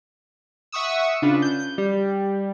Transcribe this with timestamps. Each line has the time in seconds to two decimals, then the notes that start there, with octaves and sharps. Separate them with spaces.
0.72 E5 F#5 C#6 D#6 E6
1.22 C#3 D4 F4 B4
1.42 G6
1.78 G3